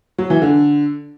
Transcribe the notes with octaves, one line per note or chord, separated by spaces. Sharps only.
F#3
E3
D3